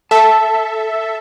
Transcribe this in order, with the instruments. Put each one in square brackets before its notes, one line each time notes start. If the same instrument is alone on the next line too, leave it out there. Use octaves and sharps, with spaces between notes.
[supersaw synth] A4 E5 [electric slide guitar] A5